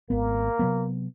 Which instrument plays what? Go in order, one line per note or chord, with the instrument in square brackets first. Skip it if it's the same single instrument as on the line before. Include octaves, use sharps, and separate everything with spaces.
[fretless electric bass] G#1 B3 [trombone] A#3
[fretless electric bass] C3 F#3 B3